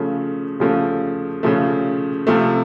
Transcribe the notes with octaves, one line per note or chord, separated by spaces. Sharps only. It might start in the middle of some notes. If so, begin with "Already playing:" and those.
Already playing: C#3 F3 A3
C#3 F3 A3
C#3 F3 A3
C3 F3 A3